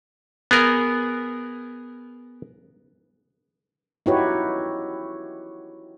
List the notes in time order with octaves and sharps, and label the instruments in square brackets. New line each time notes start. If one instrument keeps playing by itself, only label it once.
[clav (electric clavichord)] B3 G#4 A#4
[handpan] D#4 E4 F#4 G4 B4 C#5